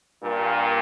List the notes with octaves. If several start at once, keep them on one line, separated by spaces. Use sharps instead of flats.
G2 A#2